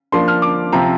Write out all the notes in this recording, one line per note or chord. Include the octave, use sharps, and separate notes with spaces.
F3 A#3 D4 C6
F6
D6
C3 F3 C4 A#5